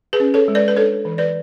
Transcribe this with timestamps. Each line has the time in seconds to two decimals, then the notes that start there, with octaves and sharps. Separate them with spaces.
0.13 G#4 B4
0.20 C#4
0.34 A4 C#5
0.48 G#3
0.55 B4 D5
0.68 B4
0.77 D4 A4 C#5
1.05 E3
1.18 B4 D5